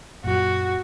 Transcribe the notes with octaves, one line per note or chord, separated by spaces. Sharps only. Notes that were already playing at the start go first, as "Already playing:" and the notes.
F#2 A#2 F#4